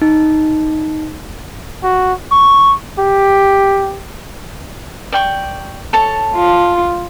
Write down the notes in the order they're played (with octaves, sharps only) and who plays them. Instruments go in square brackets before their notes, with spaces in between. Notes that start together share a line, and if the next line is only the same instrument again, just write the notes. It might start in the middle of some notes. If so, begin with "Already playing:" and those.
[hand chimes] D#4
[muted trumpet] F#4
C#6
G4
[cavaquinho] D5 G5 C#6
A4 C#5 A5
[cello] F4